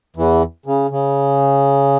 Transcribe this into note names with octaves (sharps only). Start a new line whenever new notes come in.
E2 E3
C#3
C#3